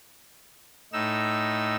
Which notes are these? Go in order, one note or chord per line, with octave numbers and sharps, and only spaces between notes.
A2 D#4 E6